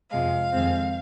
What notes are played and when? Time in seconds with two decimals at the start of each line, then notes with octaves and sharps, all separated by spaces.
0.11 F2 C3 F3 G#3 F5
0.51 F2 D#3 G#3 C4